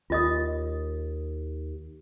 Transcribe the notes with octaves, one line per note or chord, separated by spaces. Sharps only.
D#2 F4 D#5 D#6